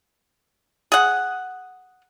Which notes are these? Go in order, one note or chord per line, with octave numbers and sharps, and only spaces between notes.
G#4 F#5